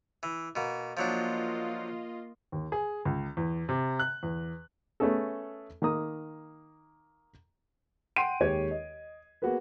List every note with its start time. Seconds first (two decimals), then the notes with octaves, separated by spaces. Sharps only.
0.23 E3
0.56 B2 A#3
0.97 F3 F#3 A#3 D4 F4 D#5
2.52 D#2
2.72 G#4
3.05 C#2
3.37 E2
3.69 C3
3.99 F#6
4.23 E2
5.00 A3 B3 C#4 G#4 A4
5.82 D#3 A#3 A#5 D#6
8.16 F#5 G5 C6 C7 D7 D#7
8.40 D#2 G#3 G4 C#5 G#6
8.71 D#5
9.42 A#3 B3 F#4 G#4 A#4 B4